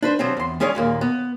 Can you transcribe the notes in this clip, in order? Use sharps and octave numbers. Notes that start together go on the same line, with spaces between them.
D4 B4 C5
C3 F3 F#3 C4
E2 C6
G#3 C#4 G#4 C#5 D5 G#5
D#2 A#2 A#3
B3